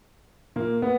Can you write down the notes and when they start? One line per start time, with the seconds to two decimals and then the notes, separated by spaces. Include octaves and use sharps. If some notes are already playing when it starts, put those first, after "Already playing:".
0.56 A#2 A#3
0.82 B3